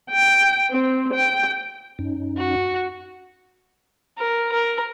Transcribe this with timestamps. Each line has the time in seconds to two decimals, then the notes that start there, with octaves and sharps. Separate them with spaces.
0.11 G5
0.71 C4
1.14 G5
1.99 F#2 C#4 D#4
2.37 F#4
4.18 A#4
4.52 A#4